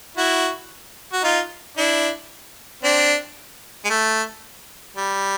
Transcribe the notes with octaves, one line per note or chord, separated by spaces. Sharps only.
E4 F#4
F#4
D#4 F4
D4 E4
C4 D4
G#3
A3
G3